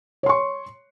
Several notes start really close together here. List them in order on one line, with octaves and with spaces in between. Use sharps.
C#5 C6 C#6